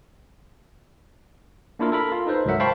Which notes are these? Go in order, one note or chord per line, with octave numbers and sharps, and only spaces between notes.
A#3 D4 E4 F4 A#4
A4 A#4 B5
F4
D#4 A4 B4 C5
C#2 G#2 F#3 A#4 E5 F#5
C5 F5 G5 A5 B5 C#6